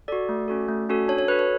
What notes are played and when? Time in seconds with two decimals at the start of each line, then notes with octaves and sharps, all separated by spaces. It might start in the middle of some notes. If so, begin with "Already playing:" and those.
0.08 F#4 A4 D5
0.29 A3
0.48 C#4 F#4 A4
0.69 A3
0.89 C#4 F#4 A4
1.08 D4 C#5
1.18 C#5
1.28 F#4 A4 B4
1.39 C#5